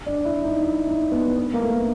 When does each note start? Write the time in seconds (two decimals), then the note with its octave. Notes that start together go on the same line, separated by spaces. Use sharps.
0.06 D4
0.25 E4
0.44 D#4
0.63 E4
0.87 D#4
1.12 B3
1.37 B3
1.54 A#3
1.62 A3